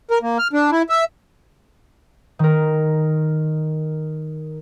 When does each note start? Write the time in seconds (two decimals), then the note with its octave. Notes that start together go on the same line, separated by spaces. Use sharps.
0.11 A#4
0.22 A#3
0.39 F6
0.53 D4
0.72 E4
0.89 E5
2.39 D#3 A#4